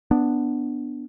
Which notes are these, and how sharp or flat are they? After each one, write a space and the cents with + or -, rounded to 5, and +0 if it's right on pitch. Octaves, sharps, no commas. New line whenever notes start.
B3 +0 D4 +0